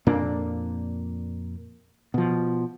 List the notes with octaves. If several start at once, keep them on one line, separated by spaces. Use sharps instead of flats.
F2 A#2 A#3 D4
B2 F3